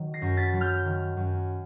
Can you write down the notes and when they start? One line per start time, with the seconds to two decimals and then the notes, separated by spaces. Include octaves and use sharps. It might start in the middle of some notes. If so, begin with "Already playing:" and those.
Already playing: D#3 F#3
0.14 A#6 C7
0.22 F#2
0.37 A6 B6
0.53 F#3
0.61 F6 G6
0.85 D#3
1.17 F#2